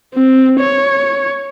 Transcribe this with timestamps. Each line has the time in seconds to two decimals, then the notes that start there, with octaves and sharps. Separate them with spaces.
0.14 C4
0.60 C#5